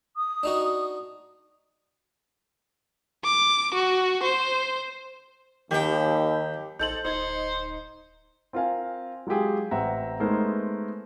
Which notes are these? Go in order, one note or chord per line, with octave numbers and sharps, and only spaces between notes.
D#6
D4 D#4 F#4
D6
F#4
C5
D#2 D#3 G4 G5
A1 D#4 A4 C5 G6 F#7
D1 D#4 C5 G#6
C4 F4 A#4 F5 G#5
F#3 G#3 F4 G4 G#4
A1 C4 E5 F#5 A#5
G#3 A3 B3 D#4 A#4 C5